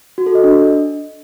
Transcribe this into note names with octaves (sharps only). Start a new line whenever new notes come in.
F#4
A4
D#5
D4